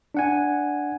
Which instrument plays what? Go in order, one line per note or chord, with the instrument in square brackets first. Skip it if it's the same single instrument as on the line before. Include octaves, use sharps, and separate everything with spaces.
[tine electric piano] D4 F#5 G#5